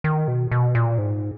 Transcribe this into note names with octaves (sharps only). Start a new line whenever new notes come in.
D#3
B2
B2
A#2
G#2